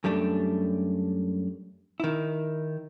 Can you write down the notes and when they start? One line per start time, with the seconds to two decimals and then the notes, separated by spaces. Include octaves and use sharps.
0.04 F#2 G3 A3 D4
2.00 D#3 E4